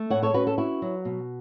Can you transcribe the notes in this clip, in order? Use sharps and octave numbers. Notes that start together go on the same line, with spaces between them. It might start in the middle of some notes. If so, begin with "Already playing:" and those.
Already playing: A3
A2 C#5 F#5
A4 C#5
C#4 F#4 B4
A4
E4 F#4
F#3
B2